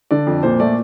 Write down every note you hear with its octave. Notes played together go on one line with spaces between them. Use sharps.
D3 D5
F2
A#2 C5
A3 D5